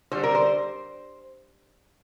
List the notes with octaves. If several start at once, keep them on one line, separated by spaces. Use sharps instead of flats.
D3 G3 C5
A#4
C5